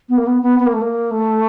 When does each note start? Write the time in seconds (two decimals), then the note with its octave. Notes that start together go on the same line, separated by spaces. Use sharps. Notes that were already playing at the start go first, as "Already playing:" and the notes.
0.09 B3
0.18 A#3
0.27 B3
0.42 B3
0.60 B3
0.67 A#3
0.73 A3
0.81 A#3
1.11 A3